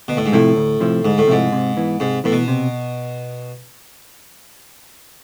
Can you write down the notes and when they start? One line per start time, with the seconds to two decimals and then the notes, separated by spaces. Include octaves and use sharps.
0.08 D2 B2
0.17 A2
0.26 G#2
0.33 A2 C3 F3 A3 E4
0.57 D2
0.80 C3 F3 A3 E4
1.05 D2 G#2
1.18 A2
1.28 G#2 C3 F3 A3 E4
1.52 C3
1.77 E3 B3
2.00 G#2 C3
2.24 A2 E3 B3
2.32 B2
2.48 C3